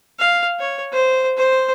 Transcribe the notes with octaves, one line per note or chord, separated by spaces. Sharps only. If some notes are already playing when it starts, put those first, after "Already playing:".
F5
C#5
C5
C5